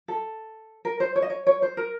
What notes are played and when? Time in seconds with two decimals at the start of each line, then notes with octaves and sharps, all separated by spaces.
0.08 A4
0.85 A#4
1.00 C5
1.16 C#5
1.22 D#5
1.30 C#5
1.47 C#5
1.62 C5
1.77 A#4